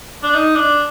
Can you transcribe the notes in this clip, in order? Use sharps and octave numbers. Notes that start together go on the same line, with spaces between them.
D4
D#4
D4